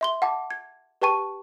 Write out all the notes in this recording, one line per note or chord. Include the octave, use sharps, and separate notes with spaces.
E5 C6 G7
F#5 A5 D6
G#6
G4 B4 G5 A5 C#6 D#7